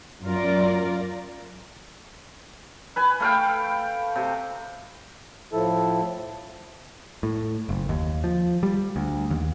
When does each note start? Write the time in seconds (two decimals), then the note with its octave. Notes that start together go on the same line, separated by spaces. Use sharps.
0.22 F#2 F4 A#4 D5
2.96 B4 G#5
3.20 A3 F5 G5
4.16 C3
5.51 A2 F3 E4 A4
7.23 A2
7.69 F#1
7.89 D#2
8.24 F3
8.63 G3
8.96 D2
9.30 D#2